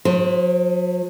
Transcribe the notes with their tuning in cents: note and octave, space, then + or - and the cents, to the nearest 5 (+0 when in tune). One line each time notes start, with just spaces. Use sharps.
F#3 -45 C5 +0